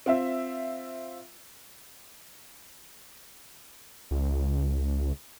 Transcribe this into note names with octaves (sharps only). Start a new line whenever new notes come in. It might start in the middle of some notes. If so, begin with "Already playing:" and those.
C4 F4 E5
C#2